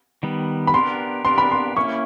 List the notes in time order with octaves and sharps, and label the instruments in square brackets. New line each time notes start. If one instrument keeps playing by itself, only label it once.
[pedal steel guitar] D#3 G3 B3
[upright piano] B5
[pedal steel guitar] B3 D4 G4 A#4 [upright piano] C6
[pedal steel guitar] B3 D4 G4 A#4 [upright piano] C6
[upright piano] B5
C6
[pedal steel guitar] A#3 C#4 E4 [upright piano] C#6